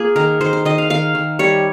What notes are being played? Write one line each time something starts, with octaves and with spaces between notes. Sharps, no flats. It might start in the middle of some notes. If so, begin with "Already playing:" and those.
Already playing: A#3 F4 G#4
D#3 A#4
D#3 C5
C5
D#3 D#5
F5
D#3 F5
D#3
G3 C#5